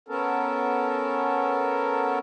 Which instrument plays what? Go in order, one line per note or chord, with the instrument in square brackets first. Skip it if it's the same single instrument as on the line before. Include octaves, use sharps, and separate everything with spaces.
[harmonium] B3 C#4 A4 A#4